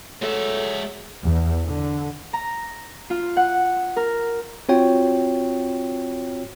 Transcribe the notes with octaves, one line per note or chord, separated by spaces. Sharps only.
F#3 G#3 A3 E5
E2
D3
A#5
F4
F#5
A#4
C4 F4 F#4 C#5 G5